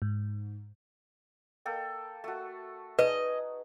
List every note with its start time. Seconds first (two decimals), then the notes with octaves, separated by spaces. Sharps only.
0.02 G#2
1.65 A#3 A4 G5
2.24 A3 F#4
2.99 D#4 G#4 B4 D#5